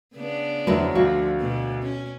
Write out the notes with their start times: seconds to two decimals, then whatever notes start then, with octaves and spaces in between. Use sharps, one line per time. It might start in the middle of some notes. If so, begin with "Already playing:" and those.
0.15 C#3 B3 D4
0.67 E2 D3 F3 F#3 B4
0.95 D2 D3 F3 F4 F#4
1.40 B2
1.82 C#4